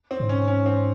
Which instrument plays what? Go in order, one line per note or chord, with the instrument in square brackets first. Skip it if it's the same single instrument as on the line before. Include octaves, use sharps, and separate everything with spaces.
[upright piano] C4
[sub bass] G#2
[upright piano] C#4
C#4
C4